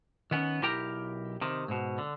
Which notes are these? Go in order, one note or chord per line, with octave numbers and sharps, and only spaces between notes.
D#3 B3 C#4
B1 E4 G4 A#4 G5 A#5
C3 D#3
G#2 B2
D3